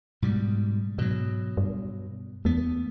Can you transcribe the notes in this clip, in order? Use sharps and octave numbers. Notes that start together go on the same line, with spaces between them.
G#2 B2 G3
G#2 B2 F#3
G2
E2 A3 B3